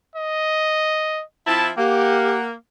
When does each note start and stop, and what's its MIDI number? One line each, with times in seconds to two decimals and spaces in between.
0.15 1.23 75
1.47 1.69 53
1.47 1.69 60
1.47 1.69 64
1.47 1.69 81
1.78 2.53 58
1.78 2.37 67
1.78 2.47 78